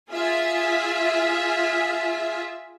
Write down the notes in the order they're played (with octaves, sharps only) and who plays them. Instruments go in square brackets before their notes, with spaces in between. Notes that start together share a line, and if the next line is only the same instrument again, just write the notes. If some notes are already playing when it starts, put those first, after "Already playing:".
[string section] F4 G#4 E5